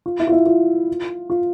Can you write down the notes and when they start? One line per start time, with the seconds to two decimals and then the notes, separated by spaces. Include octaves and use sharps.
0.06 F4
0.20 E4
0.27 F4
0.32 E4
0.46 F4
1.30 F4